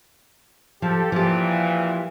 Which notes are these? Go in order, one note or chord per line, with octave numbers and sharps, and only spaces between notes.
F3 G4 A4
A#2 E3 F3 G4